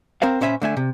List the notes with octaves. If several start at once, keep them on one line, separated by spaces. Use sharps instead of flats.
C4 A#4 C5 F5
A#2 C#4 C5 E5 G#5 B5
D3 A3 E5 G#5
C3